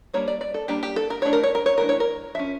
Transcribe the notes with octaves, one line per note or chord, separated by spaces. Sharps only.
G3 A#3 D4 C#5
D5
D5
A4
G3 A#3 D4 G4
G4
A4
A#4
E3 A3 D4 C#5
A#4
C#5
A#4
C#5
E3 A3 D4 A#4
C#5
A#4
F3 C#4 E5